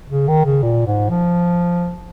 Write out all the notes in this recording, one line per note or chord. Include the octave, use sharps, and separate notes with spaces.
C#3
D#3
C#3
A#2
G#2
F3